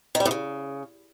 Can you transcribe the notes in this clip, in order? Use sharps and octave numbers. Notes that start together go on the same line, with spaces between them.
D#3
G3
A2
C#3